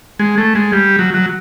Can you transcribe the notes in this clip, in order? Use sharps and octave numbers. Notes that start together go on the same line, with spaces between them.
G#3
A3
G#3
G3
F#3
F#3